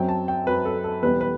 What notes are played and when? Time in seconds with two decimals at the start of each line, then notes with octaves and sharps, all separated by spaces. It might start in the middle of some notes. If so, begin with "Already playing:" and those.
Already playing: F#2 F#3 C4 G5
0.09 A5
0.28 G5
0.46 F#2 F#3 C4 B4
0.65 A4
0.84 A4
1.02 E2 B2 G3 B3 B4
1.21 B4